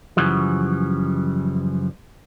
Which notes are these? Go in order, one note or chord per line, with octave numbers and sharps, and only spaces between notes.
F#2 C#3 E3 F3 G3